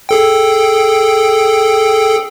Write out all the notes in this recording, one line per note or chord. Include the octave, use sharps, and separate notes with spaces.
G#4 A4 G5